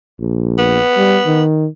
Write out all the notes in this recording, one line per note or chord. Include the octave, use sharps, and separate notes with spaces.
A#1
B3
G3
D#3